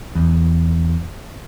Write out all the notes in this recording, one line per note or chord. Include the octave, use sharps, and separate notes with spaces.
E2